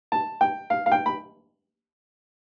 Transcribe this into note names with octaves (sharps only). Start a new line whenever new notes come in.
A5
G5
F5
F5
G5
B5